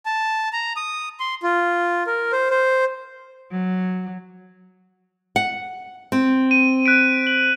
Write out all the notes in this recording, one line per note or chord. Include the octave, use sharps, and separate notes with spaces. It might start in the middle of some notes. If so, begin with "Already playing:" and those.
A5
A#5
D#6
C6
F4
A#4
C5
C5
F#3
F#5
C4
D#7
F#6 B6 D7
F#7